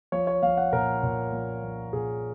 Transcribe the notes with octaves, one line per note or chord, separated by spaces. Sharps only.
F3 C#5
C#5
F3 F5
F#5
A#2 A#4
A#2
F3
F3
A#2 G#4